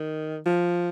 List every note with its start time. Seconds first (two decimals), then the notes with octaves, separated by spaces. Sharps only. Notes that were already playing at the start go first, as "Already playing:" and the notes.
Already playing: D#3
0.46 F3